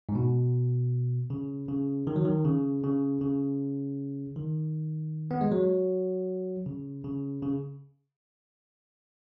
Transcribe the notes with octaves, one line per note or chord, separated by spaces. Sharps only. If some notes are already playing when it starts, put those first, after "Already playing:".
G#2
B2
C#3
C#3
D#3
F#3
D#3
C#3
C#3
C#3
D#3
B3
G#3
F#3
C#3
C#3
C#3